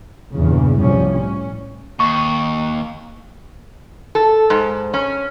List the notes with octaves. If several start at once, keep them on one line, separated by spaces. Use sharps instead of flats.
A#1 E2 G2 C#3
C2 A2 F3 G3 C#4
C#4
D#2 C#6
A4
G#2
C#4